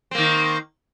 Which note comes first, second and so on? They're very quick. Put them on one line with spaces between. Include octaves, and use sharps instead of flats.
C4 A#3 D#3